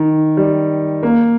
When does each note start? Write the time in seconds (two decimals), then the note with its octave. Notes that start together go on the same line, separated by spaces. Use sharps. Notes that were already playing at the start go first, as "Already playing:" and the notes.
Already playing: D#3
0.37 G3
1.03 A#3